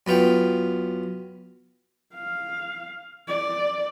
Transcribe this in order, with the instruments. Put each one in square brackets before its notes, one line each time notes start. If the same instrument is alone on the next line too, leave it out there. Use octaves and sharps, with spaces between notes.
[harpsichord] F#2 B3 F4 G5
[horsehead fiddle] F5
D5